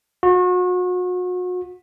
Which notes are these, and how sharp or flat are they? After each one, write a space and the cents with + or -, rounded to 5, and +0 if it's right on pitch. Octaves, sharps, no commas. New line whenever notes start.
F#4 -35